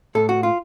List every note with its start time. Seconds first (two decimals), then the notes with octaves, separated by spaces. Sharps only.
0.15 A2 A4
0.29 F#4
0.43 F4